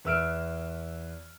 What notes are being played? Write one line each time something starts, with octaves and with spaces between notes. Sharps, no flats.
E2 B4 E5 E6 F6 D7